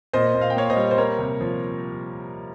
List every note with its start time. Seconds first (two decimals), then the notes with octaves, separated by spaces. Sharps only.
0.13 A#2 C5 D#5
0.35 A#2
0.41 F5
0.50 G5
0.56 A#3 C#5 F5
0.70 C5 D#5
0.77 G3
0.91 C5
0.98 A#3 A#4 C#5
1.19 C3
1.41 F3